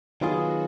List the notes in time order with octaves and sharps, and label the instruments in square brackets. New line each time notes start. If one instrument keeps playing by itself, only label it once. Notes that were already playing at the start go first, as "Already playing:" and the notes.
[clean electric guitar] D#3 F#3 B3 F4 G#4 [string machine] F#4